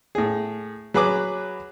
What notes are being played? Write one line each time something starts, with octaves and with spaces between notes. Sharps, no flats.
A2 G#4
F#3 G#4 B4 B5 D6 F#6